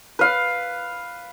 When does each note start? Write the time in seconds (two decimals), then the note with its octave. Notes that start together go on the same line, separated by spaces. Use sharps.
0.19 B4 F5